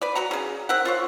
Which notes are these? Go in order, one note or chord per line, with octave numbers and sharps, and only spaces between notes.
B4 D5
F#3 F#4 F#5 A#5
C#3 G#4
C4 A#4 E5 F#5
F4 C5 C#5